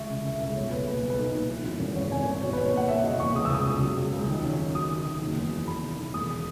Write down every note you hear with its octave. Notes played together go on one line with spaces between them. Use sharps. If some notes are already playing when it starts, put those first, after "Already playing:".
Already playing: C#2 E3 G#3 E5 C#6
C#3
C#3 E5
C#2 E5
B1 C#5
B1 B4
A#3 B4
B1
B4
D#4
A#2
E3
F#2
G#1
G#1 C#5
G#1 G#5
G#1 C#5
B2 C#5
B4
B2
C#5
A#3 F#5
A#3 E5
F#1 D#5
E2 C#6
C#2 D#6
E6
C#2 D#6
C#2
F#3
C#2
C#2
D#3
C#4
F#2
F#3 D#6
D#3
D#3
F#1
E2
F#3
E2 B5
D#3
D#3
E1 D#6